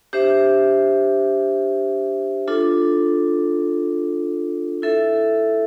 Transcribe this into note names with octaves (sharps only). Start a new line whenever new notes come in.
D4 G4 C5 E5
D4 F4 A4
E4 A4 E5